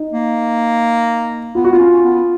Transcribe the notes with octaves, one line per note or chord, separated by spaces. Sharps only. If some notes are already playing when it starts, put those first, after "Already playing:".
Already playing: D#4
A#3
B3 F4
F#4
B3 F4
C#4
C#4
B3